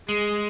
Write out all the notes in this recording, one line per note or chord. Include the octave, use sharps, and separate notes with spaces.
G#3 G#4